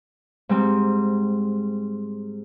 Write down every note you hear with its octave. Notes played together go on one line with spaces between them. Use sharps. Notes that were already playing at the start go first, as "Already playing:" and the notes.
G#2 G3 C4